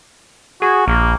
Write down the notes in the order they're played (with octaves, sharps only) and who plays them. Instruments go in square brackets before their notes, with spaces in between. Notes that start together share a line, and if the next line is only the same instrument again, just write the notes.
[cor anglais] F#4 [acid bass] G#4
[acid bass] A#1 [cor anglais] A#3